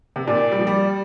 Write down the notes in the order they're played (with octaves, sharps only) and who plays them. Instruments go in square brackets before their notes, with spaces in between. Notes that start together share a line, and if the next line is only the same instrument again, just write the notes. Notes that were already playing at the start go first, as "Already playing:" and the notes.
[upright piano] C3
[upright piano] A#2 [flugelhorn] D5
[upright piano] G3
F3
G3